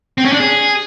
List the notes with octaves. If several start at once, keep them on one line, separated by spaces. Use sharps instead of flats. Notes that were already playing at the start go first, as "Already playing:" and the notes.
C4
C#4
D4
G#4